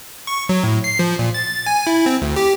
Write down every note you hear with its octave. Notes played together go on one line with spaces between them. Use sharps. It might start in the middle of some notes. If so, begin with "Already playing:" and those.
C#6
F#3
A2
C7
F3
A#2
A6
G#5
E4
C4
D2
G4